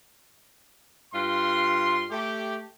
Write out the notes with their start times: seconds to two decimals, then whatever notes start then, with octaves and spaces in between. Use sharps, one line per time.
1.14 G2 F4 C6
2.11 A3 G4